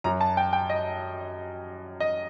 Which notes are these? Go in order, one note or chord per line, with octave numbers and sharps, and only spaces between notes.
F#2 F#3 A#5
A5
G5
G5
D#5
D#5